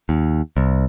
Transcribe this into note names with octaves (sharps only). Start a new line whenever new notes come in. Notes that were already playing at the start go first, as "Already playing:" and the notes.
D#2
C2